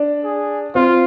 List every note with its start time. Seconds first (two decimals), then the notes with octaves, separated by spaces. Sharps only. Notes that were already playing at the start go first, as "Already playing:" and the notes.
Already playing: D4
0.24 G#4
0.75 C4 F4